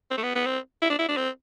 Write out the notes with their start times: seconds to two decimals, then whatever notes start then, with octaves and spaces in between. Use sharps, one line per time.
0.11 C4
0.18 A3
0.23 B3
0.35 B3
0.46 C4
0.82 E4
0.90 D4
0.99 E4
1.09 D4
1.17 C4